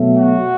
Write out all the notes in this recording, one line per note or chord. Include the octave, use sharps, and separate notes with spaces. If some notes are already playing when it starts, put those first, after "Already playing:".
Already playing: B2 F#3 A3
F#4